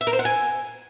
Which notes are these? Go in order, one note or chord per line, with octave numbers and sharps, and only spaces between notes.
E5
A#4
C5
F#5
G#5